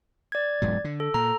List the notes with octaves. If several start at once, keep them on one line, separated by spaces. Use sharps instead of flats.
D5 G#6
E1 G#2 F#3
D3
A4
A#2 A#5